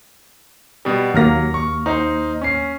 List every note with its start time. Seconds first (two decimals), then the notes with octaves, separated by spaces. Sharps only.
0.85 B2 G3
1.14 D#2 F#3 A#3 F6 A#6
1.54 C#6
1.86 D#4 C5
2.42 C#4 C7